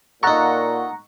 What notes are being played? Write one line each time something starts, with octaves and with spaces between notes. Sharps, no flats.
A#2 D#4 A4 F#5 A#5 C#6